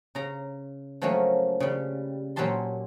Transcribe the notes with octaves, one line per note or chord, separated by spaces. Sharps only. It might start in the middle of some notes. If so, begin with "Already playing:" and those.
C#3 A#5
F3 F#3 A3 A#3 C#4
C#3 G3
A#2 F#3 C#4 G4 A5 C6